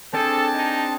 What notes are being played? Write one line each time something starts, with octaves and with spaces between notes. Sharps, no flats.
C4 D4 G#4 A4 A5
D#4